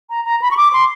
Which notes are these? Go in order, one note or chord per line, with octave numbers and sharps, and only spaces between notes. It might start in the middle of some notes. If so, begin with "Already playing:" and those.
A#5
A#5
B5
C#6
D6
C6